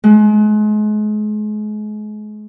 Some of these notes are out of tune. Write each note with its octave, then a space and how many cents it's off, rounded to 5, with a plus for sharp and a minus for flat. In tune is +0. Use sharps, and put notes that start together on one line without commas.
G#3 +35